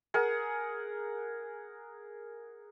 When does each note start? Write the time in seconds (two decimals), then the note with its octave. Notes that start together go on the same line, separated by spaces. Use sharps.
0.14 G#4 A#4 F#5